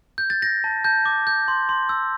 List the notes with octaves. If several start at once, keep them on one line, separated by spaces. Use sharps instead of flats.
G6
A6
G6 A#6
A5
A5 G6
D6
G6
C6
C6
E6